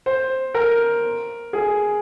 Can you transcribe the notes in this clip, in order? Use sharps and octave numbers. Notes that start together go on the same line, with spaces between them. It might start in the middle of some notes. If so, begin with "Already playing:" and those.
C5
A#4
G#4